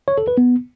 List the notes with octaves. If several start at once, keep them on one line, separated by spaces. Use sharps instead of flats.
C#5
A4
B4
B3